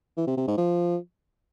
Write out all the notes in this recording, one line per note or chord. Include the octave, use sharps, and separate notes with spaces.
E3
C3
C3
G#2
F3